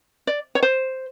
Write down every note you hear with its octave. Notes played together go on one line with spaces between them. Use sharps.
D5
C#5
C5